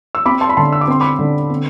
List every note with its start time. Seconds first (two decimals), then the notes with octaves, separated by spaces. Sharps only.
0.15 E6
0.25 C4 B5 D6
0.41 A5 C6
0.49 B5
0.57 D3 A5 C6
0.72 E6
0.81 D6
0.88 C4 C6
1.01 B5 D6
1.19 D3
1.50 C4